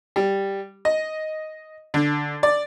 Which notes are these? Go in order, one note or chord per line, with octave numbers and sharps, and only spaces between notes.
G3
D#5
D3
D5